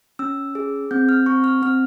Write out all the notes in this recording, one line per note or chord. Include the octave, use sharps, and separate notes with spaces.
C#4 E6
G#4
C4 G6
F6
C4 C#6
F6
C4 F6